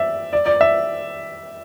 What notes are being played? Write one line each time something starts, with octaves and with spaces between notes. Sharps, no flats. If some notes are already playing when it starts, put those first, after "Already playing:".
Already playing: D5 E5
D5
D5
E5